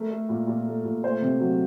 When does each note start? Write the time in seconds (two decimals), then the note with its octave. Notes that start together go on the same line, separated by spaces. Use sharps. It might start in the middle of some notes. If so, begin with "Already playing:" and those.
Already playing: A3 A#4
0.11 A3
0.29 A#2
0.47 A#2
0.67 A3
0.84 A#2
1.04 A3 C5
1.21 C3
1.40 F#3